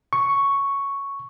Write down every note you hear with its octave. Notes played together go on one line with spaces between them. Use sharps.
C#6